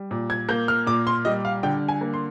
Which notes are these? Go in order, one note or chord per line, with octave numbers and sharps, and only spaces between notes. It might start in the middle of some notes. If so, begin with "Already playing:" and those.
Already playing: G3
A#2
G#6
A#3 G6
F6
A#2 D6
C6
G3 D#5
F5
D3 G5
G#5
A#3
C6